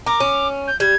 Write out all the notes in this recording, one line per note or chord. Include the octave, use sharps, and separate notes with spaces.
A#4 D6
C#4
G6
G3 G#6